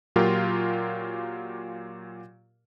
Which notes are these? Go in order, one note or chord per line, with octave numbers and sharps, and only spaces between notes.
A#2 F#3 F4 G4 A#4